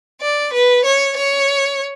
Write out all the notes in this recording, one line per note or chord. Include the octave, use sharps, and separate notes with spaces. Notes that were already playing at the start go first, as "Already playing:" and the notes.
D5
B4
C#5
C#5